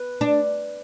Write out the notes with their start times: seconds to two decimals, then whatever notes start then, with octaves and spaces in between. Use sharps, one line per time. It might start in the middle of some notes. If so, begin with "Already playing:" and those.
Already playing: B4
0.21 D4